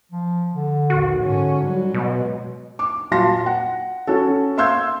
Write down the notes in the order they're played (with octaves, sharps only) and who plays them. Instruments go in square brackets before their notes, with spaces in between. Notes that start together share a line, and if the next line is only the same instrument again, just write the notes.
[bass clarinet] F3
D3
[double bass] A#1 D#2 [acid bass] F#4
[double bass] G#2 C#4 [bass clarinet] D3
[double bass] F#3 [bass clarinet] G3
[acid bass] B2 [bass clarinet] G#3
[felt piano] D6
A#2 F#3 F5 A5 C6 A#6
F#5
C#4 F#4 A4
E5 F5 C6 E6 G6 G#6